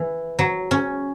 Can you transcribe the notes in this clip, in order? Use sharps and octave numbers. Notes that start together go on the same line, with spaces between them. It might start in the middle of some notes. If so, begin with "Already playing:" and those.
Already playing: E3
F#3
C#4